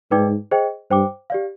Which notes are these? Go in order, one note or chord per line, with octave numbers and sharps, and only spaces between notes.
G#2 D#4 B4 D5 G5 D6
G#4 C5 D#5 G5
G2 C5 G5 D6
G4 D5 F5